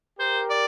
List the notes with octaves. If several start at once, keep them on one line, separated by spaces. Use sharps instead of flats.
G4 A#4 C5
D5